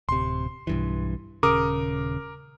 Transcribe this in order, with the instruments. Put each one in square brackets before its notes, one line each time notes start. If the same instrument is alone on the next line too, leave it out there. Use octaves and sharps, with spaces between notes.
[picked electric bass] D1 C3 [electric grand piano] C6
[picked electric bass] B1 G2 E3
[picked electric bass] D#1 C#3 [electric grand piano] A#4 D6 D#6